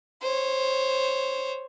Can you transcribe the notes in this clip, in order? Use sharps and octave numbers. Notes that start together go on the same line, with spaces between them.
C5 C#5